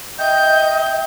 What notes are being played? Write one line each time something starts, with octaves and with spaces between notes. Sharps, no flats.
D#5 E5 G5 G6